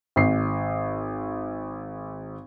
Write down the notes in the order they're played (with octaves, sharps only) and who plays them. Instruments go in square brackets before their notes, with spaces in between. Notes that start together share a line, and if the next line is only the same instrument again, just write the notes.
[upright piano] G#1 C7